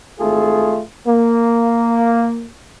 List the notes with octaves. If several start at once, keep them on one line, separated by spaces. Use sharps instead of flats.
G#1 A3 F4 G#4 A4
A#3